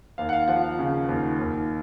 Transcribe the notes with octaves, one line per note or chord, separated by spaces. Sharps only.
D#2 F5
F#5
F5
F3 F#5
F5
C#3
D#2
D#2